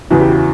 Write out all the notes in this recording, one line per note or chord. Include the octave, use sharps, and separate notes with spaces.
E2 C#3 E3 F#4
G4
F#4